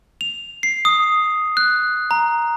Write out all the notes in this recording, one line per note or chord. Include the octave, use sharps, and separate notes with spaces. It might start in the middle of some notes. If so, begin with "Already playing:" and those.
F7
C7
D#6
F#6
A#5